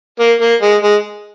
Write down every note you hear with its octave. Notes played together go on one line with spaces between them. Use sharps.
A#3
A#3
G#3
G#3